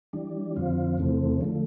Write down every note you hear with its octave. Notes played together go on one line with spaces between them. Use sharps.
E3 G3 D4
F2 D3 F3 C4 F4
E2 C3 E3 A3 C4
D3 F3 A3